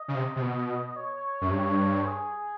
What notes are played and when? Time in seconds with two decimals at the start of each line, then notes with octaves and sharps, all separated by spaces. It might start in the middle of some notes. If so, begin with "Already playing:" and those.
Already playing: D#5
0.08 C#3
0.15 C3
0.36 C3
0.42 B2
0.96 C#5
1.41 F#2
1.51 G2 C#5
2.05 G#4